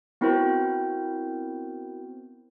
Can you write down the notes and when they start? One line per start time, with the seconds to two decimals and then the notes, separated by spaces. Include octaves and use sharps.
0.21 B3 C4 E4 F#4 A#4 C5